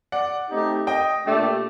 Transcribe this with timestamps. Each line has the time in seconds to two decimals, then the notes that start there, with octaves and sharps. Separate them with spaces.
0.12 D5 F#5
0.50 A3 C4 D#4 G4
0.87 D#5 G5
1.25 A#2 A3 D4 G4